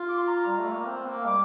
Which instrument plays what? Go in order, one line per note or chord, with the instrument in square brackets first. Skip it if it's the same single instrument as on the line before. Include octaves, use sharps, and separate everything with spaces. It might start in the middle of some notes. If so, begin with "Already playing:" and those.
Already playing: [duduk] F4
[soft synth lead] D6
C6
A#5
A#5
[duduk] G3
A3
A#3
C4
A#3
[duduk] G3 [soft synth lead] D6